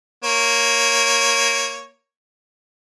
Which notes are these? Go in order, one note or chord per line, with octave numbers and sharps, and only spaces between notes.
A#3 C#5